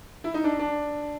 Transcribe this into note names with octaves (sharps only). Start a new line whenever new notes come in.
E4
D#4
D4
D4